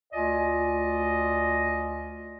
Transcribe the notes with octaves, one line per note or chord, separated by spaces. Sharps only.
D2 F4 D5 D#5 G#5